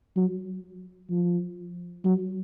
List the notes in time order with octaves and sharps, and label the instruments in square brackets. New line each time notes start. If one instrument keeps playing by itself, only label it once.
[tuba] F#3
F3
F#3